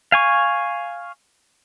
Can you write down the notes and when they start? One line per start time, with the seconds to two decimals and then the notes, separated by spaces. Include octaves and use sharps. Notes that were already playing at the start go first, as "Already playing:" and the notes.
0.12 F5 G#5 C#6